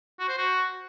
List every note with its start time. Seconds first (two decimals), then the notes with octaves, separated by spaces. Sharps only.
0.20 F#4
0.29 C5
0.38 F#4